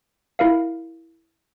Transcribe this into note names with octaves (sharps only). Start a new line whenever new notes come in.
E4 A#4 F5